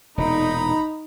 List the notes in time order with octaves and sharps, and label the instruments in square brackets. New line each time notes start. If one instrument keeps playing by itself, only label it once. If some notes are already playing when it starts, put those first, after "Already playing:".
[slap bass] E1 A#2 [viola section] D#4 [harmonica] A#5 B5